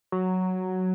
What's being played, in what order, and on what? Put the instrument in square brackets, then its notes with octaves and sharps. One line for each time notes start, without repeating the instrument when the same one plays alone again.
[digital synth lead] F#3